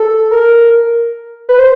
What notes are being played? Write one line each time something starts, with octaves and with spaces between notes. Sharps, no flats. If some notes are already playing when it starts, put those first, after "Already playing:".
Already playing: A4
A#4
B4
C5